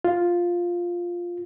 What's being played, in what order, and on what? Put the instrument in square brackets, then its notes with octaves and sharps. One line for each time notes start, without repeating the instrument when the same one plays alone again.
[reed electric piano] F4